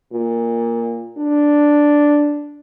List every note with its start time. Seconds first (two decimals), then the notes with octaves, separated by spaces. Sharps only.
0.12 A#2
1.18 D4